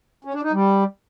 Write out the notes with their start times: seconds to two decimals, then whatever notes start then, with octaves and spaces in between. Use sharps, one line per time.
0.25 C#4
0.34 D4
0.43 D#4
0.53 G3